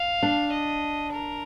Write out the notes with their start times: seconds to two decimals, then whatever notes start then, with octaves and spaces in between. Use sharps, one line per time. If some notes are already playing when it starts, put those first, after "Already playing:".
Already playing: F5
0.23 D4
0.52 D#5
1.13 A#4